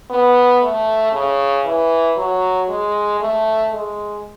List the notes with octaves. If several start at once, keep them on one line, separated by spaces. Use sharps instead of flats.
B3
A3
C#3
E3
F#3
G#3
A3
G#3